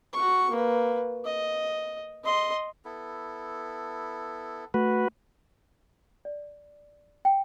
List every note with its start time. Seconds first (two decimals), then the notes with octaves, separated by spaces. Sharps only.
0.13 F#4 C#6
0.51 A#3 B4
1.25 D#5
2.24 D#5 C6
2.85 B3 E4 A4
4.74 A3 F#4 B4
6.25 D5
7.25 G5